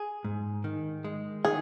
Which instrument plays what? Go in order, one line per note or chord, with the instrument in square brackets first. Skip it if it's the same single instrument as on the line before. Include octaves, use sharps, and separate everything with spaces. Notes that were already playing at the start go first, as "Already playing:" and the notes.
Already playing: [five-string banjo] G#4
[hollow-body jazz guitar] G#2
D#3
G#3
[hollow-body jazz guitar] D#3 [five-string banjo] G#4